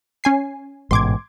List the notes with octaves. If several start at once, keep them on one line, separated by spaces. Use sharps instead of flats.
C#4 G#5 C7
A1 G#2 B2 C6 D6 G#6